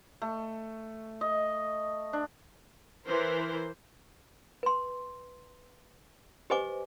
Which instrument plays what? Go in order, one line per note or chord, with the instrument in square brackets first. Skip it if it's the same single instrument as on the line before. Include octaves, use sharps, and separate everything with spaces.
[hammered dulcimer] A3
D#5
D4
[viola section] E3 A#4 C5
[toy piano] B4 C6
G4 B4 C5 D#5 G#5 D6